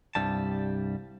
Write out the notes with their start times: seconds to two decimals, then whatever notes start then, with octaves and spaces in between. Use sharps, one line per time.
0.15 C2 G2 G3 A5